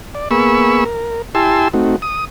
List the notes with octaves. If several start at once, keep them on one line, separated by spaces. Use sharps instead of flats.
D5
A#3 B3 G#4 B5 C#6 E6
A#4
E4 G4 G#5 A5 C6 E6
A3 C4 D#4 F#4
D#6